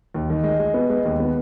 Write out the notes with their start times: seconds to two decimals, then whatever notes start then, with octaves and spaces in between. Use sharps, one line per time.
0.14 D#2
0.30 D#3
0.44 G#3
0.59 G#3
0.74 B3
0.89 G#3
1.05 D#2
1.20 B3